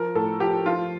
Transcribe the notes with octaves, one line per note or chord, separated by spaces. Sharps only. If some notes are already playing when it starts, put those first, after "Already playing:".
Already playing: F3 A#4
A2 A4
F3 G4
F3 F4